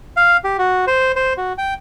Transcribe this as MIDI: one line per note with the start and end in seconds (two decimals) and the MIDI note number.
0.17 0.37 77
0.44 0.57 67
0.59 0.85 66
0.87 1.12 72
1.16 1.33 72
1.37 1.53 66
1.58 1.74 79